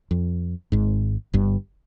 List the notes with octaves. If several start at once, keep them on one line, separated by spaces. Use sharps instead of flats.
F2
G#1 G#2
G1 G2